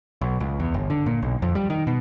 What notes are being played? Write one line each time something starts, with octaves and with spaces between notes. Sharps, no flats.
B1
C#2
E2
G1
D3
A#2
B1
F2
G3
D#3
B2